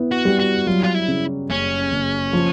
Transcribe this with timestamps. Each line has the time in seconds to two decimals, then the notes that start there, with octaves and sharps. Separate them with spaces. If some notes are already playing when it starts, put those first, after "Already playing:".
Already playing: B3 E4
0.12 F#4
0.25 G3
0.40 F#4
0.67 F#3 F4
0.84 F4
0.94 E4
1.08 C#3
1.50 F#1 C#4
1.92 F#1
2.33 F3